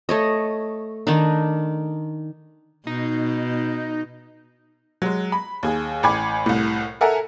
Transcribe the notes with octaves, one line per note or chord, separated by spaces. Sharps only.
A3 C#5 D#5
D#3 D4 D#4
B2 D#4
F#3 G#3
B5
D#2 G#4
A1 G5 G#5 B5 D6 G#6
C2 A2
A4 A#4 E5 F#5 G#5 A#5